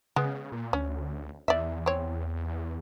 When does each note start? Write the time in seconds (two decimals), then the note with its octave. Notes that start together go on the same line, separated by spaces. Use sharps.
0.16 C#3 G#3 B3
0.52 A#2
0.73 D2 C#4
1.48 E2 D5 E5
1.86 C4 C#5